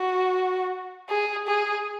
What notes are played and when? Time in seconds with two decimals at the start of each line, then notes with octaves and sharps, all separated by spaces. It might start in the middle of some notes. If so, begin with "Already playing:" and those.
Already playing: F#4
1.10 G#4
1.47 G#4